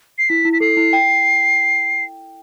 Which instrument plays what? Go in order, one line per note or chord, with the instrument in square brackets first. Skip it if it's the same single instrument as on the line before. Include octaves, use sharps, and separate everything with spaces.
[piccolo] C7
[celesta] E4 [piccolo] B6
[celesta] E4
[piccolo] B6
[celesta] A4 [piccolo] C7
[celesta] E4
G5